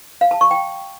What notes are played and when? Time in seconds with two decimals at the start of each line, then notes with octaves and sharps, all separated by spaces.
0.21 F5
0.31 A5
0.41 C#6
0.51 G5